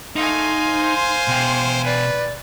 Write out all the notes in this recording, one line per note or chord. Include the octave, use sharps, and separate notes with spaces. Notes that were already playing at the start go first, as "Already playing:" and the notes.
A3 D#4 F5 G#5 C6
C5
B2 G5
B4 D5